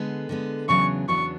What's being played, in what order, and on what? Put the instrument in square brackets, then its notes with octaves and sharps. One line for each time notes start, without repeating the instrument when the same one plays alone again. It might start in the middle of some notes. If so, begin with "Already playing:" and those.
Already playing: [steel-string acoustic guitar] D3 G#3 B3
D3 G#3 B3
[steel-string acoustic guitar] E2 C#3 F#3 B3 D4 [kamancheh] C#6
[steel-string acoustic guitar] E2 C#3 F#3 B3 D4 [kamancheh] C#6